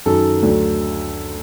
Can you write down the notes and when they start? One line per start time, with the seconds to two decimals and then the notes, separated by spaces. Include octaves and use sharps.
0.06 F#2 D#3 F#3 A4
0.42 D2 D3 F#3